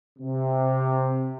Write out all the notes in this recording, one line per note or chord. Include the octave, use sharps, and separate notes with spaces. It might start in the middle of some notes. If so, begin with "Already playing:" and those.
C3